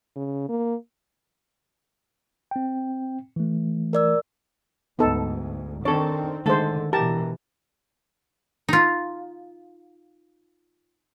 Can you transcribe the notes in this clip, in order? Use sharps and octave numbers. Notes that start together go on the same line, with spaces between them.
C#3
A#3
C4 G5
E3 A3
A#4 D5 E6
D2 G#2 B3 D#4 A4
D#3 C4 D4 A4 C#5
D3 D#3 G#3 A3 A4 C5
B2 E3 G4 A#4 A5
D#4 F4